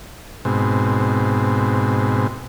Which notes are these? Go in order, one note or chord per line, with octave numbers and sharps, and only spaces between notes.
G#2 B2 C4